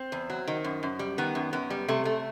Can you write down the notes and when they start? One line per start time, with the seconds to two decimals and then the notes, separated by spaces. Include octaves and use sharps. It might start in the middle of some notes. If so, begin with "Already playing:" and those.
Already playing: C4
0.12 E2
0.30 F#3
0.48 D#3
0.64 F#2
0.83 F#2
0.99 G3
1.18 D#3 B3
1.35 F#2
1.53 F#2 B3
1.70 G3
1.88 C3 A3
2.05 A3